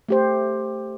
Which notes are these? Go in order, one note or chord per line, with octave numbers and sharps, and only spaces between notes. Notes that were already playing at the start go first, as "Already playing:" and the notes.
A3 G4 C5